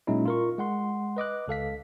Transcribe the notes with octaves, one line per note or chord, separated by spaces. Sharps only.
A#2 F#3 G#3 C#4 D#4 E4
F4 A#4 C#6
G#3 F#5 C6
B4 D#5 D6 F#6
C#2 A4 F5 B6